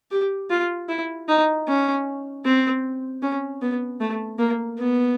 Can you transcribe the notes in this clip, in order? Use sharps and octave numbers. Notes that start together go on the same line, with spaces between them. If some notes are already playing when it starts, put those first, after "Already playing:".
G4
F4
E4
D#4
C#4
C4
C#4
B3
A3
A#3
B3